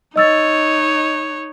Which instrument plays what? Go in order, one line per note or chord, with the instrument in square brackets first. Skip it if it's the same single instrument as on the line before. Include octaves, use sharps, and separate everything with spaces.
[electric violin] D#4 C#5 [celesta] D#5 E6 A6